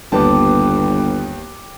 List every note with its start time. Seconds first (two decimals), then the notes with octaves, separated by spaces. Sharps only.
0.12 G1 D#2 B3 G5 A5 D6